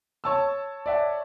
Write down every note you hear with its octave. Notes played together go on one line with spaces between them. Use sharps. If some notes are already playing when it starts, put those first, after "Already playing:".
C#5 A5 E6
D5 E5 F#5